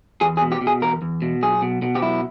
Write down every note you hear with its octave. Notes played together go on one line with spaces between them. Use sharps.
E2 G#4
G#4
B2
G4
B2
G#4
E2 A#4
E2
B2
B1 G#4
B2
B2
G4
B1 E4